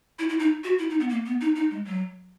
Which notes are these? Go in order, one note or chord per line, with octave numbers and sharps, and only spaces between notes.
E4
E4
D#4
F#4
E4
D#4
B3
A#3
B3
D#4
D#4
G#3
F#3